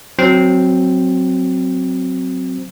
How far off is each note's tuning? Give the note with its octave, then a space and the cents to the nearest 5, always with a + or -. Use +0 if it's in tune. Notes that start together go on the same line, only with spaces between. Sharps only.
F#3 +0 C4 +0